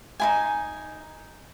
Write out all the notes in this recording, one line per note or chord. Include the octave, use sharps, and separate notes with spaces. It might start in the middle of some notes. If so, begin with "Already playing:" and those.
D#4 E4 G#5